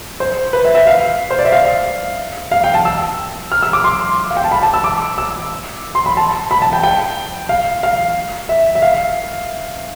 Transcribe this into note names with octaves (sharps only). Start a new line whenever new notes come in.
C5
B4
E5
E5
F5
C5
D5
E5
F5
F5
G5
A5
E6
F6
E6
D6
C6
F5
G5
A5
B5
A5
E6
D6
E6
C6
B5
A5
B5
A5
G5
G5
F5
F5
E5
E5
F5